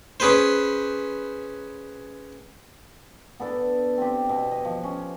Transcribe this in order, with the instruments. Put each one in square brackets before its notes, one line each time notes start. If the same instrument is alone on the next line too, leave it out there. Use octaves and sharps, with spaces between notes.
[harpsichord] C#4 G#4 B4 C5
[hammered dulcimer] B3 D4 A4 D5
C4 G4
B2
D#5
F3
C#4